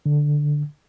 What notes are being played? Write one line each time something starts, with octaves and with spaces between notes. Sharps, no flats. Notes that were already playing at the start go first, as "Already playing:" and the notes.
D3